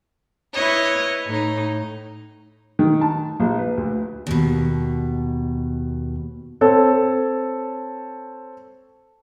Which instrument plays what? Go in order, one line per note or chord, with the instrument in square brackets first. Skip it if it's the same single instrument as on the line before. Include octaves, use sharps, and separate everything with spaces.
[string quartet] E4 B4 C#5 D#5
A2 D#4
[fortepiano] D#3
A5
A#1
B4
D2
[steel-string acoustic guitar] D#2 B2
[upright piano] C4 A4 C#5